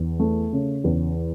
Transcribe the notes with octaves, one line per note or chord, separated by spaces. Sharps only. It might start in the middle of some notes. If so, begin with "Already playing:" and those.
Already playing: E2
A3
C#3
E2